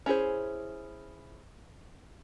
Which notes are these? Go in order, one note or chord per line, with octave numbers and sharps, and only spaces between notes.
C#4 E4 G#4 C5